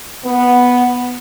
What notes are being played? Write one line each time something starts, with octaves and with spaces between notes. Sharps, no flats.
B3